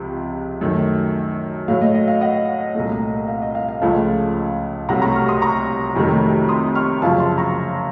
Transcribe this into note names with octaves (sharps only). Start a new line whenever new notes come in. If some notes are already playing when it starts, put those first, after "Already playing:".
Already playing: C#2 C3 F3
F#2 D#3 A3
A2 F#3 A3 F5
D#5
D#5
F5
D#5 F#5
C2 A#2 A3
F5
D#5
F5
F5
C#2 C#3 F3 A3 F5 A5
C2 C3 F#3 A3 F#5 A#5
A#5 C#6
C#6 F6
C6 D#6
A#5 C#6
F2 C3 D#3 F#3 A3
C6 D#6
C#6 F6
F#2 C#3 F3 F5 A5
A5 C6
A#5 C#6